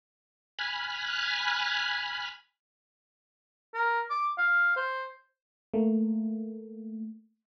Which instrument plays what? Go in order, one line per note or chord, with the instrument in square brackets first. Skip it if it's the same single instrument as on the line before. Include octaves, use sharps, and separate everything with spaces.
[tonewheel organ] G#5 B5 F6 F#6
[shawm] A#4
D6
F5
C5
[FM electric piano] A3 A#3